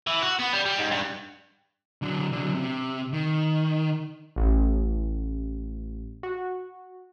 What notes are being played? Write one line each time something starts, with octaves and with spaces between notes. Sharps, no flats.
E3
F#4
B3
G3
G3
G#2
G2
D3 F#3
D3 F#3
C3
D#3
A1
F#4